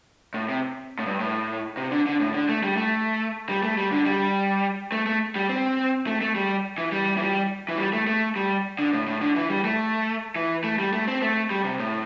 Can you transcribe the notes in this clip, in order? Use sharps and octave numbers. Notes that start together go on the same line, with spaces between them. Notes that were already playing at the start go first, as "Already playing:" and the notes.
A2
C3
A2
G2
A2
C3
D3
D3
A2
D3
A3
G3
A3
G3
A3
G3
D3
G3
A3
A3
G3
C4
A3
A3
G3
E3
G3
E3
G3
E3
G3
A3
A3
G3
D3
A2
A2
D3
E3
G3
A3
E3
A3
G3
A3
C4
A3
G3
C3
A2